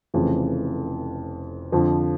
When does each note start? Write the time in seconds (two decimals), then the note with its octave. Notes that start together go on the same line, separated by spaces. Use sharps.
0.14 F1 F2 C#3 E3
1.72 F2 D3 F3